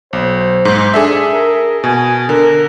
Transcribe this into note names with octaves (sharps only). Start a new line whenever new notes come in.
B1 C5
G#2 G#3
D4 G#4 A4 E5
A#4
B2 G#5
D3 A#4